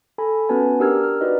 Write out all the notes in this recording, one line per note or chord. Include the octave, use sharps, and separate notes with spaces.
A4 G#5 B5
B3 C#4 F#4 B4 G#5 A5
D4 G4 A#4 E6 F6 G#6
F6
D#4 F#4 B4 D5 D#5